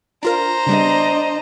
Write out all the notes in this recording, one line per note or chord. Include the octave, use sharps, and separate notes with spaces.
D4 F4 A#4 C5 A#5
C#3 G3 B3 D4 D#5